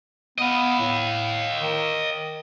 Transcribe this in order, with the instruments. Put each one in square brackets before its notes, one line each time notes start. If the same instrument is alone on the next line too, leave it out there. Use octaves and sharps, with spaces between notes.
[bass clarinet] B3 [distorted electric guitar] D#5 F5
[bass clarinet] A2
D#3